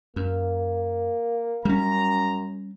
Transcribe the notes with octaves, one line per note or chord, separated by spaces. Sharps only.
F#2 A#3
F#2 G3 C#4 A#5